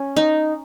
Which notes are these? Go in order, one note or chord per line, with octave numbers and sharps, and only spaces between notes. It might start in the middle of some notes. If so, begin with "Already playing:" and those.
Already playing: C#4
D#4